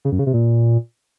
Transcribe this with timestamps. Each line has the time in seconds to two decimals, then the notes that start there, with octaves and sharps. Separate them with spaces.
0.05 C#3
0.12 F#2
0.19 C#3
0.26 C3
0.34 A#2